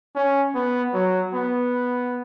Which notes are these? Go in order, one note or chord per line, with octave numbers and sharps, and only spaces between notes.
C#4
B3
F#3
B3